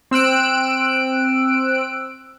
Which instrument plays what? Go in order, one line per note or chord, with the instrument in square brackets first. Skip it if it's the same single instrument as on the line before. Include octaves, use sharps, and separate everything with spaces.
[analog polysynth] C4 E6 F#6 D7